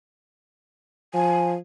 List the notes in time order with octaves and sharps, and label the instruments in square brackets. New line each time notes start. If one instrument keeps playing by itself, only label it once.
[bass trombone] F3 [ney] G#5